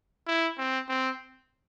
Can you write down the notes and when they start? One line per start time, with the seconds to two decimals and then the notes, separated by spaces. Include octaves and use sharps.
0.27 E4
0.58 C4
0.89 C4